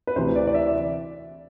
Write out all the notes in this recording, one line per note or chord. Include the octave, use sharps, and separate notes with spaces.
B4
D2 C3 E3 C5
D5
D5
E5
D5